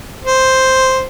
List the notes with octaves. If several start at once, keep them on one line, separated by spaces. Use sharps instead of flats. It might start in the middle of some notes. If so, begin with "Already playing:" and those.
C5